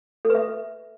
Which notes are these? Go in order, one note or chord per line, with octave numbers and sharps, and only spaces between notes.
A4
B4
E5